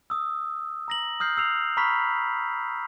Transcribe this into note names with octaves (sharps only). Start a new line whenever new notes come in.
D#6 E6
A#5 A#6 F#7
D#6 F6 G6 C7
E6 C7 F7
A#5 B5 C#6 F6 B6